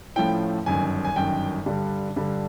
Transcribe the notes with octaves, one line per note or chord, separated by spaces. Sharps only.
A2 F3 A3 C#4 E4 G5
G1 F#2 D#3 G#5
G#5
G1 F#2 D#3 G5
G2 D3 G3
G2 D3 G3